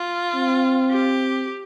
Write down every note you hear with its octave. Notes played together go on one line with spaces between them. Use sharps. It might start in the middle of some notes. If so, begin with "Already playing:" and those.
Already playing: F4
C4
G4